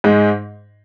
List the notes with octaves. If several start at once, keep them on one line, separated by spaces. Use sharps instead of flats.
G#2 G#3 D#4